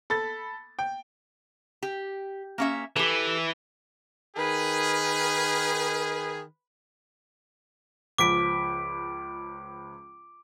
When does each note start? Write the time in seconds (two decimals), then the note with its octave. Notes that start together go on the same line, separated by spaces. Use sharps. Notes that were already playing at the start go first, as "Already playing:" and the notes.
0.10 A4 B5 A6
0.79 G5
1.83 G4
2.58 A#3 C#4 E5
2.96 E3 G4 A4
4.36 D#3 G#4 B4
8.18 C#2 F3 D6 B6 D7